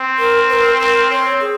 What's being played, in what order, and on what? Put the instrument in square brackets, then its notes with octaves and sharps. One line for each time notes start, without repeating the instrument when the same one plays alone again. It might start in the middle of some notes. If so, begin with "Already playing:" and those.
Already playing: [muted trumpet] C4
[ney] A#4
C5
A#4
[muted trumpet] C4 [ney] A#4
[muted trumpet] C4 [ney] C#5
[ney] G#4